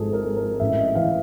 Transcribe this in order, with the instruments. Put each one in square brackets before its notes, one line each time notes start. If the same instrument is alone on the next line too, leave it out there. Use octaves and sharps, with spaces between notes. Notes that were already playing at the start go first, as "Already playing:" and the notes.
Already playing: [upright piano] G#1 G#2 F3 G#4 A4
A#4
G#3
A#4
A1 E5
D#5
E3 F5